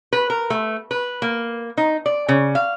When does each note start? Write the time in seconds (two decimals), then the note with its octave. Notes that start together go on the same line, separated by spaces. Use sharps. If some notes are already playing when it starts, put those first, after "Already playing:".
0.13 B4
0.30 A#4
0.50 A3
0.91 B4
1.22 A#3
1.78 D#4
2.06 D5
2.29 C#3
2.55 F5